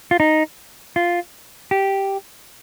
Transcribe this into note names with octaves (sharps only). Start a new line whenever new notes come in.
F4
D#4
F4
G4